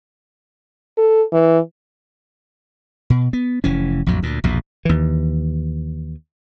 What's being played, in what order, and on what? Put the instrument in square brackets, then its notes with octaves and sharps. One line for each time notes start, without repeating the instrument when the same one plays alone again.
[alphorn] A4
E3
[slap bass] B2
B3
F1 E3 C#4
A#1 F2 A2 F#3
D2 A#2
A#1 E2 B2
D#2 E3